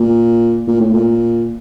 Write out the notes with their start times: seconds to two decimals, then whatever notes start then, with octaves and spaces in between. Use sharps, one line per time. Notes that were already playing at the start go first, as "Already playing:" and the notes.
Already playing: A#2
0.67 A#2
0.80 A2
0.93 A#2